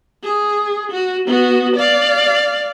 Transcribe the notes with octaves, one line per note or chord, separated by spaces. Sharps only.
G#4
F#4
B3 F#4
D5 F5